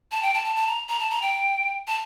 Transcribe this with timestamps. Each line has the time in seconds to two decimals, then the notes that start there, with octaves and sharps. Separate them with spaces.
0.12 A5
0.23 G5
0.34 A5
0.44 A5
0.56 A5
0.67 A#5
0.89 A#5
1.00 A5
1.10 A#5
1.22 G5
1.87 A5